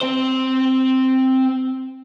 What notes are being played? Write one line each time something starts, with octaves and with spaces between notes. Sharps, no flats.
C4 C5